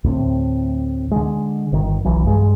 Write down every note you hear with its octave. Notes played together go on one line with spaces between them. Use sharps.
D2 A2 C4
D3 G#3
G1 D#3
D1 B1 E3 F#3
G2 G#3